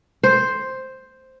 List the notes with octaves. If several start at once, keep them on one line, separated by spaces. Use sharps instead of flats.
C5